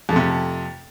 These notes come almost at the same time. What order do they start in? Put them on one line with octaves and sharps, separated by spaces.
F2 A3 C3